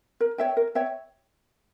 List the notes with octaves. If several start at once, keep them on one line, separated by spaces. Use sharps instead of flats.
A#4
C#5 E5 G5
A#4
C#5 E5 G5